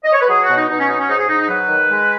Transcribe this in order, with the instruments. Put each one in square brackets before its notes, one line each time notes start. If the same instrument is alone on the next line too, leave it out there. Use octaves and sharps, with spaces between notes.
[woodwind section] D#5
C#5
B4
F#3 G#4
F#4
B2
D#4
B2 D#4
C#4
F#3 D#4
C#4
G#2 D#4
G#4
G#2 D#4
D#4
F#3 B4
D#3
G#3